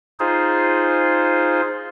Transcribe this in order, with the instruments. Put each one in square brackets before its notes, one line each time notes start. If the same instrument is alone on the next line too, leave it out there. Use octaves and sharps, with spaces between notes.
[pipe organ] D#4 F4 G#4 C5